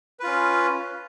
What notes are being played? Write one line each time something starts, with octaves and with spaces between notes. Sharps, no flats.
C#4 F4 B4